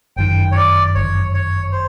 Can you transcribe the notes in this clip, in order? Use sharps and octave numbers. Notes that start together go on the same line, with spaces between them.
G1 F#2 D#3 G5
C#5
D5
G1 F#2 D#3 C#5
C#5
C5